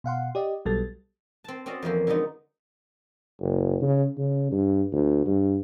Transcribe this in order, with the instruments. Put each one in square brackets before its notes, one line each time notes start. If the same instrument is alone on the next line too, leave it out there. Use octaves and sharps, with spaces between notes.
[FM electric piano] B2 F5 F#5 C6
G4 D5 D#5
B1 F#3 G3 B3 A4 A6
[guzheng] C4 A5
C4 C#4 F#4 D5 D#5
F2 E3 F3 A#3
D3 F#3 G#3 B3 D#4
[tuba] F#1
C#3
C#3
G2
D2
G2